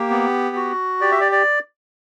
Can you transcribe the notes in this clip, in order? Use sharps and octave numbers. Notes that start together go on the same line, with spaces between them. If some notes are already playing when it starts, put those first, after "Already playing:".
Already playing: A#3 G4
B3
F#4
G4 D5
E5
D5
D5